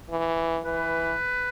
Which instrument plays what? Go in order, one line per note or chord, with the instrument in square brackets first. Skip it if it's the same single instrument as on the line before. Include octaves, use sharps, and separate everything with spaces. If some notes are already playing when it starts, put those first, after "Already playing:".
[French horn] E3
[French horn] E3 [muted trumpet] B4